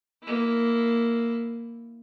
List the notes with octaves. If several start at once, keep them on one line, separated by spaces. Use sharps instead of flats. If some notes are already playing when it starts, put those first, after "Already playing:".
A#3 E4